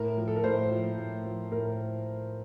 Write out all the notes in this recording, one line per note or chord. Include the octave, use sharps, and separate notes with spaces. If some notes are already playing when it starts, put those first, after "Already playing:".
Already playing: A2 A#4
F3
A4
A#4
A2 C5
F3
A2
F3
A2 A#4